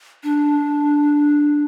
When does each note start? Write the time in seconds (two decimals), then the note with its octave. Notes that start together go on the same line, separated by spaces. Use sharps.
0.23 D4